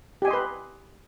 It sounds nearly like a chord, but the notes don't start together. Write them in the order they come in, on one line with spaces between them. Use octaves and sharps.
G4 G#5 D#5 C6 B4